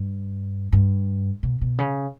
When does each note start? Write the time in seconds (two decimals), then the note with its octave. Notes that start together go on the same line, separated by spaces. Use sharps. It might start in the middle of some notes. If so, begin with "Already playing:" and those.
Already playing: G2
0.72 G2
1.43 B2
1.61 B2
1.78 C#3